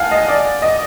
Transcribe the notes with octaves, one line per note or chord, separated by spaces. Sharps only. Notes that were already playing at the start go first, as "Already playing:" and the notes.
Already playing: F5 F#5 G#5 A5
D#5
D5
D#5